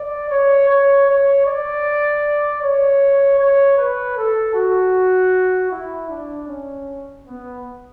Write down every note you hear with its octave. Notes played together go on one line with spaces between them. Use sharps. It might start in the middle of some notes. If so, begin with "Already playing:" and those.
Already playing: D5
C#5
C#5
C#5
D5
C#5
C#5
B4
A4
F#4
E4
D4
C#4
B3